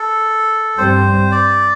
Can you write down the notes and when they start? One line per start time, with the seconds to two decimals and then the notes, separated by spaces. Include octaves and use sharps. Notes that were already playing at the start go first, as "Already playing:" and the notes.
Already playing: A4
0.78 G2 G3 C4 C5
1.32 D5